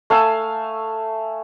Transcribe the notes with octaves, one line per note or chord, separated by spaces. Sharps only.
A3 F5 G#5 E6